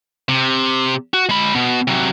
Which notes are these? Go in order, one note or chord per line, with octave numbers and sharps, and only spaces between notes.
C3
F#4
G#3 B5
B2
C3 F#3